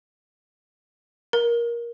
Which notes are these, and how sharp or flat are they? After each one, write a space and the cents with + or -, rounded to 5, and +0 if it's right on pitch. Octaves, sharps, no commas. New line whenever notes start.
A#4 +15